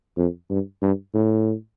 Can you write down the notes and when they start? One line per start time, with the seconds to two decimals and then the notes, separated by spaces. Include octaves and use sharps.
0.17 F2
0.50 G2
0.82 G2
1.14 A2